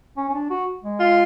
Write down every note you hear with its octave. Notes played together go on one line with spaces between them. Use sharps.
C#4
C#4
D4
F#4
G#3
F4